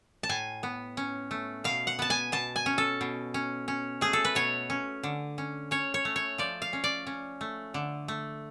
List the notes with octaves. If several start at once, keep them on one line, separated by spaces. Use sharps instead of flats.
A5
A2 G#5
B3
C#4
A3
B2 F5
F#5
B3 A5
G#5
B2 A5
G#5
C#4
A4
B2
C#4
C#4
A3 G#4
A4
B4
B2 C#5
C#4
D3
C#4
C#4 C#5
C#5
A3
C#5
F3 D5
F5
C#4
D5
C#4
A3
D3
A3